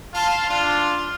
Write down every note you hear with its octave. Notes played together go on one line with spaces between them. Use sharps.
F4 F5 A5 C6
D4 F4